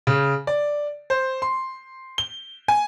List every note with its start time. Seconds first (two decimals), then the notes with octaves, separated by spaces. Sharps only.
0.07 C#3
0.47 D5
1.10 C5
1.42 C6
2.18 G7
2.68 G#5